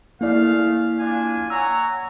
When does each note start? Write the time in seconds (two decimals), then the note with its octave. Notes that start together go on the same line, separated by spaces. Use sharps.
0.21 A3 A#3 E4 G#4 D5 F5
0.99 D4 F4 G#5
1.50 C#5 F#5 G#5 A#5 E6